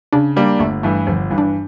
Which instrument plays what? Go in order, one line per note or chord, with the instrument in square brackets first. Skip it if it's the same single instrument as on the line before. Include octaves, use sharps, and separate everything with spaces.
[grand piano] C#3 [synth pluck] D4
[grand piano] G3 A#3 D4
[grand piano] G1 [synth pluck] A3
[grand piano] G2 E3 [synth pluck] A3
[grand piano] G1 [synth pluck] F3
[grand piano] G2 E3
[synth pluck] D4